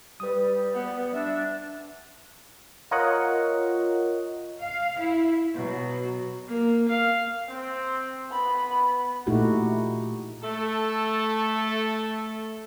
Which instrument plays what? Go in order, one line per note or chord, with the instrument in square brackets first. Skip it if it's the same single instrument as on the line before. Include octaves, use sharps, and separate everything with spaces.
[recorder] G3 [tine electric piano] B4 D#6
[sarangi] B3
[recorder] D4 [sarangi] E5
[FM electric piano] F4 A#4 C#5 D#5 F#5
[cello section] F5
E4
[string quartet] B2 F#3
[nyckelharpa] A#3
F5
[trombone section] C4
[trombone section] B3 [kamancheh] B5
[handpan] A#2 A3 D#4 E4 F#4 G4
[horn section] A3 A4